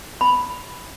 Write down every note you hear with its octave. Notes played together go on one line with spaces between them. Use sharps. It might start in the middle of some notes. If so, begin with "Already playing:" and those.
B5